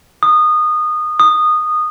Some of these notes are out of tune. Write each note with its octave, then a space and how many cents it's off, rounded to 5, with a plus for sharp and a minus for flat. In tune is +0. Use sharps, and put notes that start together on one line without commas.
D#6 -20
D#6 -15